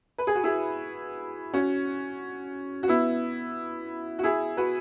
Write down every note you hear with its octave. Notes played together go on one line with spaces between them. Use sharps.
B4
G#4
F#4
E4 G#4
C#4 F#4
F#4
B3 E4
F#4
E4 G#4
F#4 B4